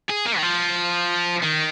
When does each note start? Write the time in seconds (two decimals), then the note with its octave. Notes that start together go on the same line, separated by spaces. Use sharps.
0.09 G#4
0.25 A#3
0.37 D#3
0.42 F3
1.43 D#3